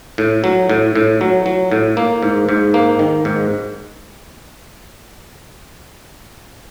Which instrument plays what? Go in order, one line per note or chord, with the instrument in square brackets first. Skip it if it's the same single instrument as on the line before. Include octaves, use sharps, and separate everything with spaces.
[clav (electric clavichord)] A2
F#3
A2
A2
F#3
F#3
A2
A#3
G#2
G#2
A#3
D#3
G#2